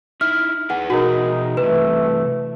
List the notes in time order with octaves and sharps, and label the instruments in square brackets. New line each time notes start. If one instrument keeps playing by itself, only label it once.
[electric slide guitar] D#4 E4 E5 [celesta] F6
[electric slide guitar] G#4 B4 G#5 [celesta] F#5
[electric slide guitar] B2 G#4 [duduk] D#4 [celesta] F#4 A#4
[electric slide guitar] C3 E3 [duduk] A3 [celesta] B4